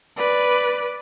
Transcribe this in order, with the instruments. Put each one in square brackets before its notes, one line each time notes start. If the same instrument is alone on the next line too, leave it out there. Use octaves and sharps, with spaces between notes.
[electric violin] B4 D5